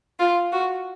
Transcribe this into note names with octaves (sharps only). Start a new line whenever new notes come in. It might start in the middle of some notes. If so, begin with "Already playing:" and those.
F4
F#4